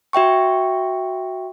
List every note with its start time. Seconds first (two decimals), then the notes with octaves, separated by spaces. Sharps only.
0.13 F#4 E5 G5 C#6